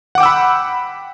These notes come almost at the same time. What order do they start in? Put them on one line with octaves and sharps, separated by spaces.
F#5 D6 G5 E6 B5